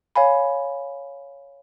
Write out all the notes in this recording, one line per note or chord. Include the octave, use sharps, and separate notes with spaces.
C#5 F5 G#5 B5